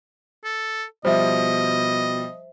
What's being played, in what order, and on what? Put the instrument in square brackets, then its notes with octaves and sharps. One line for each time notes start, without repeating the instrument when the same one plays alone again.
[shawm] A4
[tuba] B2 [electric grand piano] F3 G3 [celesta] C5 E5 [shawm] D#5